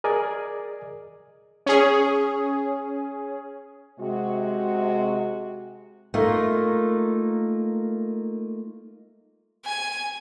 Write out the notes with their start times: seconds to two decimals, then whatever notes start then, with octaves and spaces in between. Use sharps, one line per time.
0.04 G#4 A#4 D5 D#5 G#5
1.66 C#4 G#4
3.99 C3 G#3 F#4
6.14 A3 A#3 D#4 F4
9.65 G#5